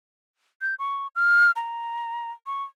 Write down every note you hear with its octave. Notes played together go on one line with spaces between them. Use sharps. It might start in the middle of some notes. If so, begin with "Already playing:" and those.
G6
C#6
F6
A#5
C#6